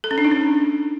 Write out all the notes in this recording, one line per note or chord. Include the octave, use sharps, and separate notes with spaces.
A4
C#4
D4
D#4
C#4